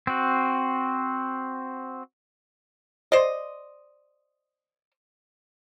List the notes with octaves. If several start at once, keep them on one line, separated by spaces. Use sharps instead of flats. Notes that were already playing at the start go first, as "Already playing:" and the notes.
C4 F#4
C5 D5 D#5